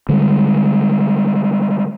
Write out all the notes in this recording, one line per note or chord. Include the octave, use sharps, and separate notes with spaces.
D3 G3 G#3